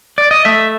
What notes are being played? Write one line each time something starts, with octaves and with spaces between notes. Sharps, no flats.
D5
D#5
A3 E5